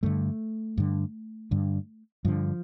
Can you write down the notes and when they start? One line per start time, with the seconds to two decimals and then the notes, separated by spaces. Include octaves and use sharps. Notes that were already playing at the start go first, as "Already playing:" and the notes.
0.03 G2 D3 A3
0.78 G2 D3
1.51 G2 D3
2.25 G2 D3 F3